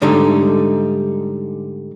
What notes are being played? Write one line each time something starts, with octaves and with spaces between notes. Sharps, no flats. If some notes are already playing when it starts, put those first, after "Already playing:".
G#2 D3 G3 A3 D#4